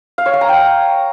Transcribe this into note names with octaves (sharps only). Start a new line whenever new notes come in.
F5
C#5
F5
A#5
G5